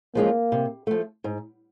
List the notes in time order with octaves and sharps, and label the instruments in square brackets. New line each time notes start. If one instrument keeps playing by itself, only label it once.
[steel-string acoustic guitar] F3 G#3 C#4 F4 [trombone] A#3
[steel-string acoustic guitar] C3
F3 A3
G#2